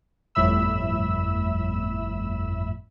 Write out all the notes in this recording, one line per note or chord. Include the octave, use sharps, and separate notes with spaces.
G1 F2 A2 E5 B5 E6